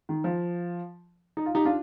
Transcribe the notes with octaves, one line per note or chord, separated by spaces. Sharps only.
D#3
F3
D#4
F4
D#4 G4
D4 F4